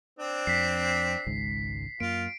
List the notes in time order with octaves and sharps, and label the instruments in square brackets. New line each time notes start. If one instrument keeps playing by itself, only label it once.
[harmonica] C4 D4
[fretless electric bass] F2 [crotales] B6 C7
[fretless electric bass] G#1 C#2 G#2
[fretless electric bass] F#2 A#3 [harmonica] F4 [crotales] D7